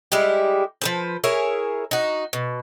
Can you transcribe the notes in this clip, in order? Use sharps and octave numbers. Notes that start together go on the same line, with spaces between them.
G3 G#3 E4 G4
F3 B4 C5
E4 G#4 A#4 C#5
D#4 F#4
B2